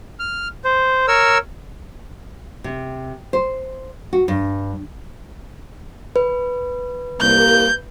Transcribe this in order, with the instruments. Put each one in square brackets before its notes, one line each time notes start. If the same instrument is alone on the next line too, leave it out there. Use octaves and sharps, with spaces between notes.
[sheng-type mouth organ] F6
C5
A#4 C#5 E6
[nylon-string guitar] C3
C5
F#4
G2
[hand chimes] B4
[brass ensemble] C2 A#3 [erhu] G6